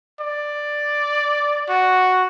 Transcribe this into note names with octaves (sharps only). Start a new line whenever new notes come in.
D5
F#4